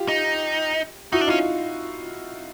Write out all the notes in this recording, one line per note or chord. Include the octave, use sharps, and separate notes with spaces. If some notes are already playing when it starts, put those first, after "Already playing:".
Already playing: F4 G4
D#4
D#4 E4 F#4
D4
D#4 F4
C#4